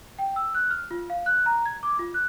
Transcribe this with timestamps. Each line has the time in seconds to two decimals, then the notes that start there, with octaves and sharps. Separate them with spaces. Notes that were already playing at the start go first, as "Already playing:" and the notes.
0.19 G5
0.36 E6
0.55 F#6
0.71 F6
0.91 F4
1.10 F5
1.26 F#6
1.46 A#5
1.66 G#6
1.83 D6
1.99 F4
2.14 F#6